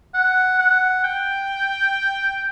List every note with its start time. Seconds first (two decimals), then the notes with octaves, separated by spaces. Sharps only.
0.14 F#5
0.59 F#5
1.04 G5